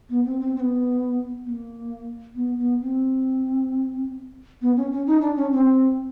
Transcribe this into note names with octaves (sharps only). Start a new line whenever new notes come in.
B3
C4
C4
C4
B3
B3
A#3
B3
B3
C4
B3
C#4
C#4
D#4
D4
C#4
C4